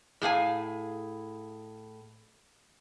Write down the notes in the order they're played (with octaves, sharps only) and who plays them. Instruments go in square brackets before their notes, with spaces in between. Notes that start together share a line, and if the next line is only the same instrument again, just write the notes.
[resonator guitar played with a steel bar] A2 G#4 F5 G#5